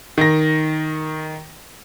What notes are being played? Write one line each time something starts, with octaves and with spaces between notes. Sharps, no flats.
D#3 A#6